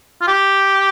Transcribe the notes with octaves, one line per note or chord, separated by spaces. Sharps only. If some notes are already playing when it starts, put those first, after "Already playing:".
F4
G4